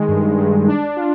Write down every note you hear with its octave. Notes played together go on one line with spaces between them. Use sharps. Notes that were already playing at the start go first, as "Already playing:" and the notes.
Already playing: D#3 G#3
G2
G2
D4
F4